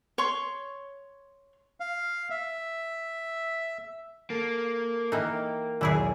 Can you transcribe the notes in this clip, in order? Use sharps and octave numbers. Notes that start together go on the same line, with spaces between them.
C#5 C6 C#6
F5
E5
A#3 A4
E3 D#4 A#4 G5
B1 E2 D#3 E3 E4 G#4